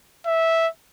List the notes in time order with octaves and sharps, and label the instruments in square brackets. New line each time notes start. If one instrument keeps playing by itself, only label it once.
[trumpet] E5